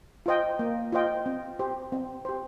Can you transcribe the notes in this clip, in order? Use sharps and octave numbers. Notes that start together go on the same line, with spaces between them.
F4 C5 D#5 G5
A#3
F4 C5 D#5 G5
C4
G4 C5
C4
G4 C5